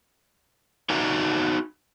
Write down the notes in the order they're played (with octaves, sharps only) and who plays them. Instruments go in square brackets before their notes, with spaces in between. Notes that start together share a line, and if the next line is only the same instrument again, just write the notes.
[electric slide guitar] D#4 F#4 D5 E5 G#5 A#5